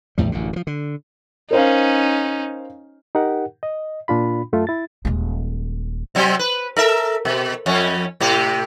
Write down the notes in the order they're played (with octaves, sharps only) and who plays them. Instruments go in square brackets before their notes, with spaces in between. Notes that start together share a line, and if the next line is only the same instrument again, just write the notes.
[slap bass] A#1 E2 A2 G3
A1 F#2 D3
D3 F3
D3
[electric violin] C#4 D#4 [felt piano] A#4 C5 F5
[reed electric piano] D#4 G4 A#4 F#5
D#5
A#2 D4 F4 B5
F#2 A3 F4
E4 A6
[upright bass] D#1 G#3
[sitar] C3 F#3 C4
B4
A4 A#4 E5
B2
F2 C#4
A2 C3 G4